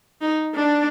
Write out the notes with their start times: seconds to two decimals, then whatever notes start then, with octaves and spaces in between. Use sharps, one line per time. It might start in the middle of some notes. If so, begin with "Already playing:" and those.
0.22 D#4
0.56 D4